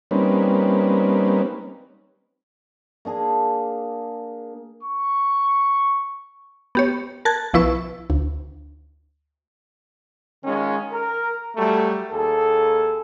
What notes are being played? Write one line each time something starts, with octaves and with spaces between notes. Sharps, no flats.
G3 A#3 C4 C#4 D#4 B4
A#3 D4 G#4
C#6
B3 G4 C#5
A#4 A5 F#6 G#6 A6
B1 F3 E4 B4 C#6 E6
D2
D#3 G#3 C#4 F4
A#4
F#3 G3 A3
D#2 G#4 A4